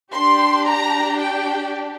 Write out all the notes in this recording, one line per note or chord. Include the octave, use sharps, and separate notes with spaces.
D4 G4 C6
A#5
G5